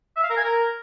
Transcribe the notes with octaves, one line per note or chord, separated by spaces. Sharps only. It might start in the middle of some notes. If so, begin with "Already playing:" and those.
E5
F5
A#4
G#5
A#4